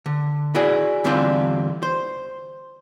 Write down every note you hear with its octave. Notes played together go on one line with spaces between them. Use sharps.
D3
E4 F#4 G#4 D5
E2 D3 G3 C4 D4 F4
C5